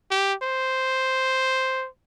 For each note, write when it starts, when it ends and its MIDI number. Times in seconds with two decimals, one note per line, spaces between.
0.11 0.34 67
0.42 1.88 72